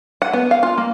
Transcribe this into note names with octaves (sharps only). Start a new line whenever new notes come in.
F#5
B3
F5
F4
A#3